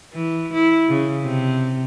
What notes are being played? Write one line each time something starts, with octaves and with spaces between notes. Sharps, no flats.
E3
E4
C#3
C3